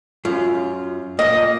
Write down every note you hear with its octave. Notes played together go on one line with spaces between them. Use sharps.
F#2 F4
A#2 A#3 D#5